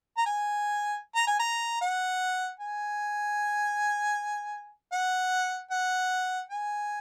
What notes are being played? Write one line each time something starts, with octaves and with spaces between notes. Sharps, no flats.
A#5
G#5
A#5
G#5
A#5
F#5
G#5
F#5
F#5
G#5